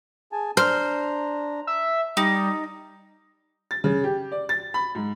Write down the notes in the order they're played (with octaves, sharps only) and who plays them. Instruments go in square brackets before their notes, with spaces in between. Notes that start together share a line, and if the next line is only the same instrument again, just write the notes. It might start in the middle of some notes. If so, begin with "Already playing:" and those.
[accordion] G#4 G#5 A5
[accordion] D4 A#5 [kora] C5 [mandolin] F6
[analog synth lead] E5
[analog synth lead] G3 [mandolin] D#4 [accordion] A#5
[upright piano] A6
C#3
G4
D5
A6
B5
G#2